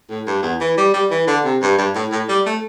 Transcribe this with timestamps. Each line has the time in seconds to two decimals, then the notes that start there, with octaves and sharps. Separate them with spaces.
0.10 A2
0.27 G2
0.43 E2
0.61 E3
0.77 G3
0.93 G3
1.10 E3
1.27 D3
1.45 C3
1.62 G2
1.78 G2
1.95 A2
2.11 A2
2.29 G3
2.46 A3